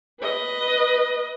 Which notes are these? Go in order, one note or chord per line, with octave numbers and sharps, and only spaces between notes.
B4 D#5